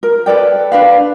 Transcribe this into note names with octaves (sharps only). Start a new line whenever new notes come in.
A#4
A4 B4 D5 G5
D4 B4 F5